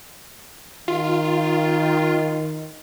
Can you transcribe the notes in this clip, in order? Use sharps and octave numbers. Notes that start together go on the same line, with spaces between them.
D#3 F4